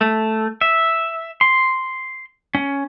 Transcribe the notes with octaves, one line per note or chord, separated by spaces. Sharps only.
A3
E5
C6
C#4